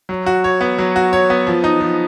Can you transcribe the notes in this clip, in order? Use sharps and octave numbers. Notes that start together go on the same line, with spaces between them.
F#3
F#4
C#5
B3
F#3
F#4
C#5
B3
F3
D#4
F3